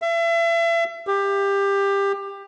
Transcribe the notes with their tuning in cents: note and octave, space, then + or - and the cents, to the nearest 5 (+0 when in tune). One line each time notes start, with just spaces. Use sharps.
E5 +35
G4 +20